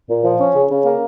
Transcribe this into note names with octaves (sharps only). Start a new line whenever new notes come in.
A#2
F3
C#4
C#3
C#3
A#3